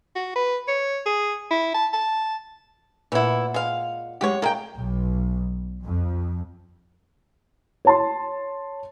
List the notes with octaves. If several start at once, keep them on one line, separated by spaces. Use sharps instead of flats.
F#4
B4
C#5
G#4
E4
A5
A5
A#2 E3 E4 F#5
G#3 F5
F#2 G#3 G4 C#5 F#5
G#3 A#3 A#4 G5
B1
F2
C#5 A5 C6